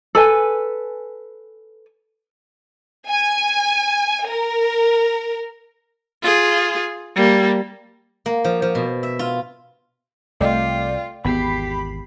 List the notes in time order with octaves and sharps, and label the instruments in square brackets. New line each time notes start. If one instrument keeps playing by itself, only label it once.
[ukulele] A4 B4 G#5
[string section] G#5
A#4
[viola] F4 G#4
G3 A#3
[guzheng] A#3
F3
F3
B2
E5
F4
[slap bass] C2 [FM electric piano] A3 D5 G5 [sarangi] F4 [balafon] D#5
[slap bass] G#1 E2 [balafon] B3 [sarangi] G4 [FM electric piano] B5 B6 C7